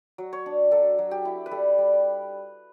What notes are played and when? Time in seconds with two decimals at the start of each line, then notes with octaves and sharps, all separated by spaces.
0.18 F#3
0.33 C#5
0.46 D4
0.71 F#3 A4
0.98 F#3
1.11 G4
1.25 E4
1.46 B4
1.51 G3 A4
1.78 G3